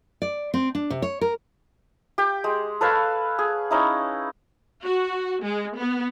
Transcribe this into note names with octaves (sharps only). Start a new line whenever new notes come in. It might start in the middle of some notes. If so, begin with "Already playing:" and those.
D5
C4
D4
C3
C#5
A#4
G4 G5
G#3
A4 B4 C#5 F5
G#4
C#4 D#4 E4
F#4
G#3
B3